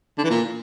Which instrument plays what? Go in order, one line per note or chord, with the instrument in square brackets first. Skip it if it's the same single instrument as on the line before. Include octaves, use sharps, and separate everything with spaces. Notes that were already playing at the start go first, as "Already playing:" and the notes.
[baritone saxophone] D3
E3
A#2